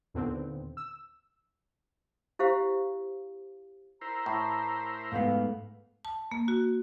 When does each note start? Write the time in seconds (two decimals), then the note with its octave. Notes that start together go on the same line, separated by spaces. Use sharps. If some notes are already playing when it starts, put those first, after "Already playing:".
0.14 D#2 A#2 D3 B3 C4
0.77 E6
2.39 E4 G4 C5 F5
4.01 E4 A#4 C5 A#5
4.26 A2
5.12 G#2 A3 B3 F5
6.05 A5
6.32 A#3
6.48 F#4